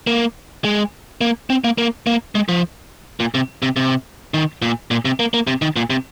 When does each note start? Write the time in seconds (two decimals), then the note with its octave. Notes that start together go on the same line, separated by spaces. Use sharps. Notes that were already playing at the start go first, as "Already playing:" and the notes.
0.07 A#3
0.64 G#3
1.21 A#3
1.50 C4
1.64 A#3
1.78 A#3
2.07 A#3
2.35 G#3
2.49 F3
3.20 A#2
3.34 C3
3.62 C3
3.76 C3
4.34 D#3
4.62 A#2
4.91 A#2
5.05 C3
5.20 A#3
5.34 A#3
5.47 C3
5.62 D#3
5.76 A#2
5.90 C3